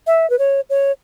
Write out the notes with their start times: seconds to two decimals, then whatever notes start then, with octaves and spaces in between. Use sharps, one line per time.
0.07 E5
0.30 B4
0.39 C#5
0.70 C#5